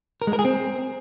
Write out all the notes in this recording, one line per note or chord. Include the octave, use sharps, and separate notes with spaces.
A#4
G#3
A#4
G#4
C4